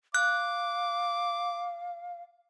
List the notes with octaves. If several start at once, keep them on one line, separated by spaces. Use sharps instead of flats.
F5 D6 F#6